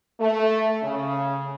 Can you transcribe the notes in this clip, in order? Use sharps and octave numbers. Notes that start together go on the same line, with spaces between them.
A3
C#3